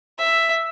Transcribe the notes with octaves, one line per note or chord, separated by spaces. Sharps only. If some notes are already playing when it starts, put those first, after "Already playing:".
E5